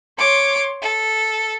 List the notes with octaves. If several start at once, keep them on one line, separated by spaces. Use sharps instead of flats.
C#5 C6 D6
A4